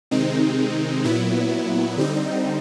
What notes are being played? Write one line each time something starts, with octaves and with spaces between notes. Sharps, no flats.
C3 D#3 G#3 C4 D#4
A#2 F#3 B3 E4
D3 G3 C4 D#4